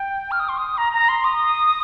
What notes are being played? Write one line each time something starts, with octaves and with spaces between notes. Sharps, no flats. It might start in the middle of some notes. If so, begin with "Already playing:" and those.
Already playing: G5
F6
D#6
C6
D#6
A#5
A#5
C6
D#6